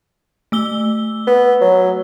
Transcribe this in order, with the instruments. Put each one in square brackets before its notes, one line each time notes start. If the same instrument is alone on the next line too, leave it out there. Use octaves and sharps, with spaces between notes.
[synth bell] A3 E6 G7
[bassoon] B3
F#3